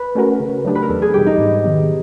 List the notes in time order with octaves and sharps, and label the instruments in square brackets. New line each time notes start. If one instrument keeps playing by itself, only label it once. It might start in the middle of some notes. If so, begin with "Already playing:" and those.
Already playing: [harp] B4
[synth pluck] A3 C#4 F#4 A#4
C#3
F#3 A3 D4 G4
[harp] B4
A#4
[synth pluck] E2 [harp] A4
[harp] G#4
[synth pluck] B2 G3 [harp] G4
[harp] D#4
[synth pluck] G#2
D#3 F#3 B3